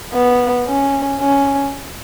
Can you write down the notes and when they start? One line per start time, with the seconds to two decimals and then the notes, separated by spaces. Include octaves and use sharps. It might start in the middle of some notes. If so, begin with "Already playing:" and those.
0.13 B3
0.67 C#4
1.21 C#4